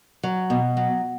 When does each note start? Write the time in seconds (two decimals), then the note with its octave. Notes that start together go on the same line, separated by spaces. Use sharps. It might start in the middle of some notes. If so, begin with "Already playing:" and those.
0.23 F#3
0.50 B2
0.77 F#3